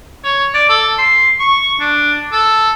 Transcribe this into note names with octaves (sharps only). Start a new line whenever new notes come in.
C#5
D5
A4
C6
C#6
D4
A4